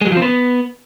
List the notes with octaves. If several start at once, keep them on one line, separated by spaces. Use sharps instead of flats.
G#3
F#3
F3
C4
B3